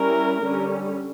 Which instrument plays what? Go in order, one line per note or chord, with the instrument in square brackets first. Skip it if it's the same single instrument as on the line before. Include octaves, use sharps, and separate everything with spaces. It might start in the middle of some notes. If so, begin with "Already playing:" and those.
Already playing: [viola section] G3 C#4 E4 A#4
D3 G3 C#4